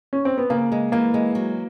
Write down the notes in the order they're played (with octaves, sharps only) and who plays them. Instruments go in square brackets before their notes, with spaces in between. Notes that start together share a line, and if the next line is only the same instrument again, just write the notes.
[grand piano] C#4
C4
B3
[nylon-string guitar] C#3 [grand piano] A#3
[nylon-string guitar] G#3
[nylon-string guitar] E3 [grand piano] A#3
[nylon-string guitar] G#3
F#3